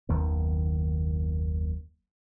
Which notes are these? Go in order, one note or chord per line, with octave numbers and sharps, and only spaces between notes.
F#1 D#2 D#3 B3